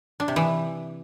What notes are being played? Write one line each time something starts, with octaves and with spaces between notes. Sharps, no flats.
D4
C3
E3